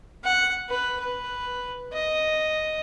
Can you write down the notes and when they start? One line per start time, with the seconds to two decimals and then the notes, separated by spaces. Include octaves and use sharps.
0.24 F#5
0.69 B4
1.00 B4
1.93 D#5